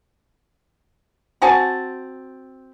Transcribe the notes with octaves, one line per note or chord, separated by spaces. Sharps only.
C4 F#4 G#5 A5